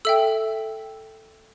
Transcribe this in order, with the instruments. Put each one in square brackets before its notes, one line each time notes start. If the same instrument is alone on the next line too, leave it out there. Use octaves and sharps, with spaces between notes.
[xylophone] A4 E5 G5 E6